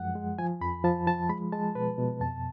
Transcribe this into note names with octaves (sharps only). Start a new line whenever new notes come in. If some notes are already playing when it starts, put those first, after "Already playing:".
Already playing: F#2 F3 G#3 F#5
G#3
F3 G#5
F2 B5
F3 A5
F3 A5
G#3 B5
G#3 A5
B2 B4
B2
F2 A5